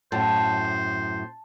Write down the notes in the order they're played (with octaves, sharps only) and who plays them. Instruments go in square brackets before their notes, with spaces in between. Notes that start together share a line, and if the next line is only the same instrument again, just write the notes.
[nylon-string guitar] F#2 A2 [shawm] C5 [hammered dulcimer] A5